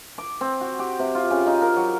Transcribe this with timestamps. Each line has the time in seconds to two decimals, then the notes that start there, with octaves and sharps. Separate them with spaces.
0.18 D6
0.41 C4
0.61 F#4
0.79 G4
0.99 C3
1.15 F4
1.31 C#3
1.47 D#4
1.62 A#4
1.76 F#3